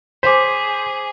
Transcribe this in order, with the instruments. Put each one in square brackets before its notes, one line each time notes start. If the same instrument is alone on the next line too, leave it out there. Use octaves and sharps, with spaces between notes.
[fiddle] G#4 [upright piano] C5 [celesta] D6 B6